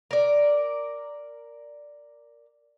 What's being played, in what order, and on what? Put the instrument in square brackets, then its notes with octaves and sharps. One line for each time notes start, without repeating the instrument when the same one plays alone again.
[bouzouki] A#4 D5